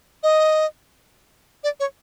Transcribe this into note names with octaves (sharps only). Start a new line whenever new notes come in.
D#5
D5
C#5